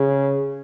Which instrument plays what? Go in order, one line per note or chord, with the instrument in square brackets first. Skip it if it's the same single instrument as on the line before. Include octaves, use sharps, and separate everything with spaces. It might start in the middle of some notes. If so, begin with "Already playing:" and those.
Already playing: [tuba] C#3